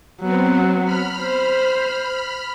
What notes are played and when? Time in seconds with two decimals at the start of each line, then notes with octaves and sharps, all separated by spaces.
0.21 F#3 B3 C4
0.85 B5 F6
1.20 C5